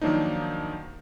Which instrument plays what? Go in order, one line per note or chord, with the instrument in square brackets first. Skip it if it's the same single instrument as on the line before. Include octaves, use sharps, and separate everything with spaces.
[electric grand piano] D#3 F3 F#3 A#3 D4 D#4